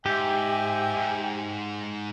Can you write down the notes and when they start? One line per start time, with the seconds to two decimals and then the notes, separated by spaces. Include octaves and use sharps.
0.06 G#2 G4 E5 G5 G#5
0.96 G#2